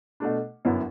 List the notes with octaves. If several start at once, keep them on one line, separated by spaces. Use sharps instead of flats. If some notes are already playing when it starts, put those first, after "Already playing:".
B2 A3 D4
G1 F#2 F#3 B3 E4